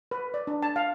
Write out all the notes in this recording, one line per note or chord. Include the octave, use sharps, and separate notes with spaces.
B4
D5
D4
A5
F5